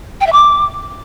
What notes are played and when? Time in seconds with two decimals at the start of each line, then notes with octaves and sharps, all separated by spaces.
0.21 G5
0.27 E5
0.33 D6